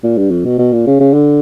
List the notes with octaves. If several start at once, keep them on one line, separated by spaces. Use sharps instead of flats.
A#2
G2
F2
B2
B2
A#2
C#3
C#3
D3